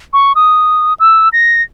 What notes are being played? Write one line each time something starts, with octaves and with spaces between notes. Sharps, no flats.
C#6
D#6
E6
A#6